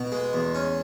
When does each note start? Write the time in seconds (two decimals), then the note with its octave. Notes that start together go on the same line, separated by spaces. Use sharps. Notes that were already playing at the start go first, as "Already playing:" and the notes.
Already playing: B2
0.12 G#3
0.33 E2
0.55 C#4